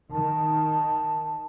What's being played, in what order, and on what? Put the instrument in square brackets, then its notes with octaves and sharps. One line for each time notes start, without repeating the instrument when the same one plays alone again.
[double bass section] D#3 [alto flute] A5